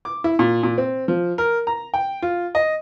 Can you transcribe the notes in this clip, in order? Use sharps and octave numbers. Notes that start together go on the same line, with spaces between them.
D6
E4
A#2
A#2
C4
F3
A#4
A#5
G5
F4
D#5